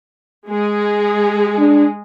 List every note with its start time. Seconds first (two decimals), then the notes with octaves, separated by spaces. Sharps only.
0.48 G#3 G#4
1.58 D4